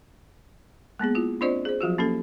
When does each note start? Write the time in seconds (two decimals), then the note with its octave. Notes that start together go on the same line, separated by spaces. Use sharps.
0.99 G#3 A#3 B3 G#4
1.15 E4 F4
1.41 C4 D4 F4 C5 D5 D#5
1.65 G#4 C5
1.81 F3 F#3 F4 F#4
1.98 A#3 C#4 G4 A4